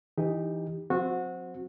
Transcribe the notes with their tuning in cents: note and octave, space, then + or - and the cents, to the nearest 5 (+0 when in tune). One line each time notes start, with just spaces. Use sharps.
E3 +0 D#4 +0 G4 +15
F#3 -40 C4 +0 F#4 -20